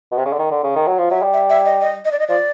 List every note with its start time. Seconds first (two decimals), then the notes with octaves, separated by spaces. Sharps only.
0.12 B2
0.18 C3
0.26 C#3
0.32 D3
0.39 D#3
0.51 D3
0.63 C#3
0.76 D#3
0.87 F#3
0.98 F3
1.10 F#3 E5
1.22 G3
1.33 E5
1.50 E5
1.65 D#5
1.81 D#5
2.05 D#5
2.12 D5
2.19 D#5
2.28 F3 D5